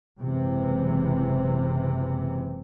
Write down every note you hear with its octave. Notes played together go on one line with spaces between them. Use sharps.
F#1 G#2 C3 E3